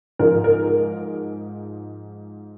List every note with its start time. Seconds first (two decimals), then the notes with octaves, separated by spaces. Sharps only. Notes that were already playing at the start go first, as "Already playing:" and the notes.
0.19 G#2 F3 G#3 A#4
0.44 A#4